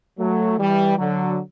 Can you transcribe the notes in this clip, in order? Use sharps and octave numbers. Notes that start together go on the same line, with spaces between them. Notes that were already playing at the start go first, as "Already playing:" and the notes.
F#3 A3
E3 G3
D3 F#3